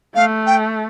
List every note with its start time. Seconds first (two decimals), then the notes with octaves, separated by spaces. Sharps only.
0.15 A3 F5
0.47 G5